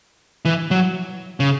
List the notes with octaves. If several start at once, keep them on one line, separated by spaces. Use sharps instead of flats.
E3
F#3
C#3